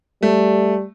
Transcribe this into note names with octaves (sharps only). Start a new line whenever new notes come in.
G3 A3